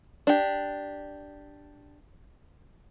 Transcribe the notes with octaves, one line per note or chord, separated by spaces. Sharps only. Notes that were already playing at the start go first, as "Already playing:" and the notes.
D4 G4